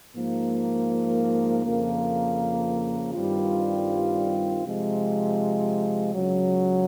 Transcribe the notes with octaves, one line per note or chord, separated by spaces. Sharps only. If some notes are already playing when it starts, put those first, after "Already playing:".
G#2 F3 A#3
F2 C#3 F3 A#3
G2 D#3 G3 C4 F4
C3 F3 G#3
C#2 C#3 F#3